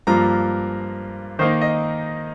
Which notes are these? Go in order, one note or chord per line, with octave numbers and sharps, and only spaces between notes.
G2 F3 A#3 F4 A#5
D#3 A#3 D#4 C5
D#5